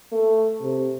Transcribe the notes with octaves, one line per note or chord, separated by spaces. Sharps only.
A3
C3